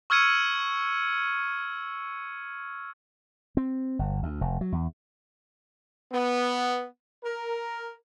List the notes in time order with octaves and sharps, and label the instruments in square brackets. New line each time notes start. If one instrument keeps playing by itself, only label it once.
[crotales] C#6 E6 F6 G#6 C#7 D#7
[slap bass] C4
G1
D2
F1
F#3
E2
[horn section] B3
A#4